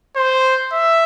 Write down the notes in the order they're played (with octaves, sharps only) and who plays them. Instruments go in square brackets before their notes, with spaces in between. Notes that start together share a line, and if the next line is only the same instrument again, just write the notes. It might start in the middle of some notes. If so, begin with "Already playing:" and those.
[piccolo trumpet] C5
E5